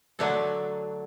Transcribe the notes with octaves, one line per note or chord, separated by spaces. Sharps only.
D3 F#3 A3 D4 A4